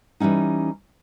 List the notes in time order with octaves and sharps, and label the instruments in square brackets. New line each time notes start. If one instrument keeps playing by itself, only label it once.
[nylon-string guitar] E3 G3 A#3 C#4 D#4